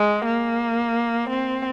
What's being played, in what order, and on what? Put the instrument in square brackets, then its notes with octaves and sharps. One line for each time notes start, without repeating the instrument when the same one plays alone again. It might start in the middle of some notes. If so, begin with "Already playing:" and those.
Already playing: [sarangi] G#3
A#3
C4